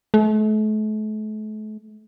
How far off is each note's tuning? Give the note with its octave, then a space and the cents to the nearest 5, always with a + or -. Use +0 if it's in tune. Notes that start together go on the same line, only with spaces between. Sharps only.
A3 -40